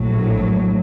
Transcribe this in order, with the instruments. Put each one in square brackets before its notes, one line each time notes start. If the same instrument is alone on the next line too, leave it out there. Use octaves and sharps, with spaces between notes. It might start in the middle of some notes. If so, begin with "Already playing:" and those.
Already playing: [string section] A#1 A2 F#3